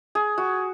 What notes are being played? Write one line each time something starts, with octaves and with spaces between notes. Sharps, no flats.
G#4
F#4